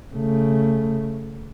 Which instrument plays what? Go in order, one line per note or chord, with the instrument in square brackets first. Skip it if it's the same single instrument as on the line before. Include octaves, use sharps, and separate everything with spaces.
[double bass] C#3 A3